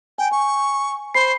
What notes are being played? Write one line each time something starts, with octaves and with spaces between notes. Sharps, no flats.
G5 G#5
G#5 C#6
C5 B5 C7